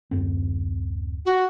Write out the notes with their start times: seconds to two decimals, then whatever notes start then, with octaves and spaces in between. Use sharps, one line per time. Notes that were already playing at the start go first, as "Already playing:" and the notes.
0.11 D1 F#2 C4
1.26 F#4